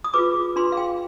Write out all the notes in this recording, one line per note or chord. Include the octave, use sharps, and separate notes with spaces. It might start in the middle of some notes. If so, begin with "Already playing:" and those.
D#6
F4 G#4 B4 D6
D4 F4 G#4 B4 C6
F5
G5